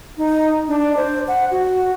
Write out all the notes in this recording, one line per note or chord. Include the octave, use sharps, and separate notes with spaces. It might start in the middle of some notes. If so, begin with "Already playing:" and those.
D#4
D4
C5
F#5
F#4